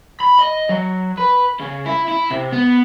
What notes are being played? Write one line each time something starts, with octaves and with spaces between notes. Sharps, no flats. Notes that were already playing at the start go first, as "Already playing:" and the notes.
B5
D#5
F#3
B4
C#3
E4
E4
C3
B3